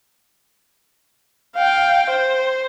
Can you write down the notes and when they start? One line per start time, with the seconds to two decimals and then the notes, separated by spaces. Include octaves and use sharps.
1.56 F5 G5
2.10 C5